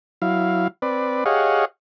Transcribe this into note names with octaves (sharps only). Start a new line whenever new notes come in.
F#3 E4 F5
C4 B4 D5
G4 G#4 C#5 D#5 F5 F#5